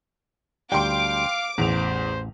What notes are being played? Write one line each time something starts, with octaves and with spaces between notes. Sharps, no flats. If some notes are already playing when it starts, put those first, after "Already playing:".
D2 G3 F5 G5 C6 D6
A1 E2 C5 F7